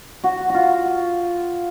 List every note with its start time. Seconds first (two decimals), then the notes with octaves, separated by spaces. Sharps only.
0.24 F#4
0.49 F4 F#4